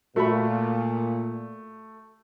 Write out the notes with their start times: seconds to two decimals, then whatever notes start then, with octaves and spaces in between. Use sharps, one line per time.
0.16 A#2 A3 F#4 E5 B5